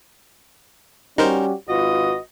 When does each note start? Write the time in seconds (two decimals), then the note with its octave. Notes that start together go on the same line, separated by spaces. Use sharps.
1.18 G3 C#4 D#4 F#4 G4 A#4 C5
1.69 G#1 F4 F#4 B4 D#5